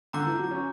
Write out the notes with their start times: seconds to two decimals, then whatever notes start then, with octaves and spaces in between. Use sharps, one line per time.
0.13 D3 A#5 D6 G6
0.27 E3
0.39 F#3
0.51 C#4